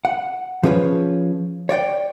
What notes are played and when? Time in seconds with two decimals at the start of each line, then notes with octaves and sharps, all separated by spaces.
0.05 F#5
0.63 F3 C#4 G#4 B4 C#5
1.69 C#5 D5 F#5 G5